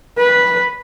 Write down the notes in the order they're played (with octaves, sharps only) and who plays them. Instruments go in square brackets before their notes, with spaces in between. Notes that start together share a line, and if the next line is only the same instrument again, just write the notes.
[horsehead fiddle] B4